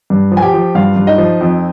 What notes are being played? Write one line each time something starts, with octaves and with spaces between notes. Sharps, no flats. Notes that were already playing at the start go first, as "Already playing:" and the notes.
G2
F3
G#5
G4 G5
F3
G2 F4 F5
G2
D#4 D#5
F3
F2